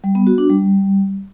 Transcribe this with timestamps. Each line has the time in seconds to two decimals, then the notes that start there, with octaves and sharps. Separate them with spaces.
0.04 G3
0.15 B3
0.27 F#4
0.38 D4
0.50 G3